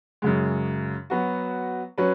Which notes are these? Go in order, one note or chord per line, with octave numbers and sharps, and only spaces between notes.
F#2 C#3 G#3
F#3 B3 F#4
F#3 C#4 B4